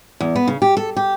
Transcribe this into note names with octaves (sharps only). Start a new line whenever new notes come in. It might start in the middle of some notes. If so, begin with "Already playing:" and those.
E2
B3
C#3
G4
A4
G4